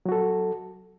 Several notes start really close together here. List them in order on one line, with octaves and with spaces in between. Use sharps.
F#3 F#4 A4